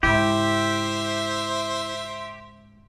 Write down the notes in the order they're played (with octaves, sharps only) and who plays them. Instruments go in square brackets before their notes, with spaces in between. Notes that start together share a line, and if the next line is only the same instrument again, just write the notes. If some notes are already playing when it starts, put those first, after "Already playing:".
[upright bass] G#2 C#3 [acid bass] E4 [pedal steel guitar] G4 [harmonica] C5 E5